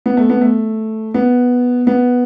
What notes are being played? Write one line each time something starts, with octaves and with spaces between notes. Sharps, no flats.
B3
A3
B3
A3
B3
B3